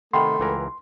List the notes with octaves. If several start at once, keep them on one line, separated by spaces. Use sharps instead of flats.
C3 D#3 A3 F#5 G5 B5 C6
C#2 E3 A#4